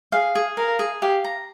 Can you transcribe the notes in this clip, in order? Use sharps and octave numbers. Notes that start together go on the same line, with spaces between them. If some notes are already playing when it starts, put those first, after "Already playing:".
G#4 F5
G#4
A#4 F5
G#4
G4 F5
A#5